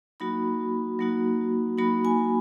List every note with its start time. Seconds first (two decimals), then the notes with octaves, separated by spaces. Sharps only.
0.20 F#3 A#3 D#4 F#4 B5
0.99 F#3 A#3 D#4 F#4
1.78 F#3 A#3 D#4 F#4 B5
2.05 G#5